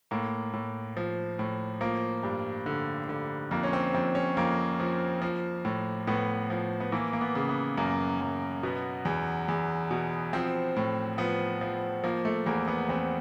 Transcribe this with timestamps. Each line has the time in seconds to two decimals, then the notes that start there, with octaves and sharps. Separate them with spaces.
0.11 A2 A#3
0.53 A2
0.97 F3
1.39 A2
1.81 F3 A#3
2.23 G2
2.66 D3
3.09 D3
3.51 F2 A#3
3.63 C#4
3.73 C4
3.94 F2 C4
4.15 C#4
4.37 F2 A#3
4.80 F3
5.22 F3
5.65 A2
6.07 A2 B3
6.50 F3
6.80 B3
6.92 E3 A#3
7.13 A#3
7.21 B3
7.35 C#3
7.49 B3
7.77 F#2 A#3
8.21 F#2
8.63 B2 B3
9.05 E2
9.48 E2
9.91 B2
10.33 F3 C4
10.76 A2
11.18 F3 B3
11.61 F3
12.04 F3 A#3
12.25 A3
12.46 E2 A#3
12.67 B3
12.89 E2 C4